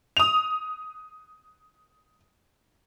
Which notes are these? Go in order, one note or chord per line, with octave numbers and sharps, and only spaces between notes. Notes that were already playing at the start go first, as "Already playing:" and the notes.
D#6 F7